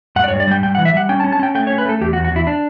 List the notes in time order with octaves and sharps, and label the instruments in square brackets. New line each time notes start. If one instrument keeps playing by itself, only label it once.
[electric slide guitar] G2 F#5
D5
C#5
G2
D5
G3 G5
G2 G5
F#5
E3
E5
G3 F#5
C#4 G5
A5
C#4
A5
C#4 G5
A3 G5
C#5
C#4
B4
A3 A4
E2 G4
F#4
E2
F#4
E2 E4
D4